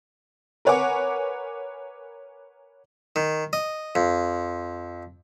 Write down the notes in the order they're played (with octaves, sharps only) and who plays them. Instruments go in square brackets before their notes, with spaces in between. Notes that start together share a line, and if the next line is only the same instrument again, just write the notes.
[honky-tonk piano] A#4 B4 C#5 F#5 G#5 D6
[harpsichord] D#3
D#5
F2